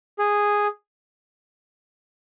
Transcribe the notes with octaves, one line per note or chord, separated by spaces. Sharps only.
G#4